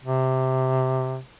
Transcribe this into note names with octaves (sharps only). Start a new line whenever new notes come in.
C3